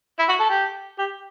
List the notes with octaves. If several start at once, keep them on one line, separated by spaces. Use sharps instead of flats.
E4
F#4
A4
G4
G4